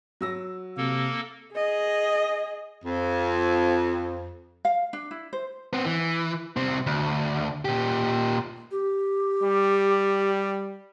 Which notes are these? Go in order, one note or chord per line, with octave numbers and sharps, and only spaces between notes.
F#3 E6 A#6
C3 A#3 A4
G#4 D#5
F2
F5
D4
E4
C5
B3 C4
E3
C2 C4
D2
A#2 G4
G4
G3